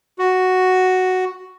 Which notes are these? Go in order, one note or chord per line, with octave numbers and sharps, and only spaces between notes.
F#4